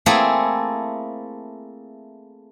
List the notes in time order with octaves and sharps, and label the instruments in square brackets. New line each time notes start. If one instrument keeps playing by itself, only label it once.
[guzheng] A3 A#3 C4 E4 G#4 A4